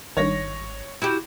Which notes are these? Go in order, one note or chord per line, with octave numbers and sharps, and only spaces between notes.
G#1 G2 D#3 C#5 A#6
E4 F#4 G4